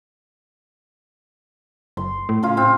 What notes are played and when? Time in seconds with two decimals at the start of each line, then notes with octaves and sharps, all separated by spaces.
1.97 F#1 C6
2.29 A2
2.43 C#3 F4
2.57 C4 F4